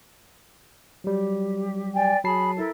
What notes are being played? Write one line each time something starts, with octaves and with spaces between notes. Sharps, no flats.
F#3 G3 G4
D5 G5 G#5
F#3 G#4 A5 B5 C7
E4 A4 A#4